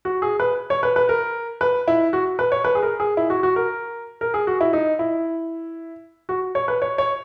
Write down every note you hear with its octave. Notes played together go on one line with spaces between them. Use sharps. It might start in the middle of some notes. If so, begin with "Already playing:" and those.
F#4
G#4
B4
C#5
B4
B4
A#4
B4
E4
F#4
B4
C#5
B4
G#4
A#4
G#4
E4
F#4
F#4
A#4
A#4
G#4
F#4
E4
D#4
E4
F#4
C#5
B4
C#5
C#5